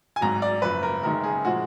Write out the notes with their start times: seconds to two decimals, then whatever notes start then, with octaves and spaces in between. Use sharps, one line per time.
0.16 G#5
0.21 G#1 G#2 F#3 A#5
0.42 D5
0.62 F#1 F#2 F3 B4
0.83 A#4
1.03 F#1 F#2 D#3 G#3 A#4
1.24 G#4
1.45 A#2 F3 G#3 F#4